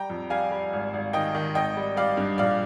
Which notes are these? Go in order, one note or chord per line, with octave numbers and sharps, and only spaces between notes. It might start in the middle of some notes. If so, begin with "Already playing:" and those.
Already playing: G3 G5 A#5
F2
G3 F5 G#5
G3
G#1
G#1
D#3 D#5 G5
D#3
G#1 D#5 G5
G3
G3 D5 F5
G2
A#1 D5 F5